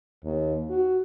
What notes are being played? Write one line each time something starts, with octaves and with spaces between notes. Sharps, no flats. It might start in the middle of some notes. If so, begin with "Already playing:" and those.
D#2
F#4